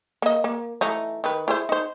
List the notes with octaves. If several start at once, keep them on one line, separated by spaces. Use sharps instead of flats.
A#3 D#5
A#3
E3 A3 D#4
D#3 B4
E4 G#4 C5
D#4 C5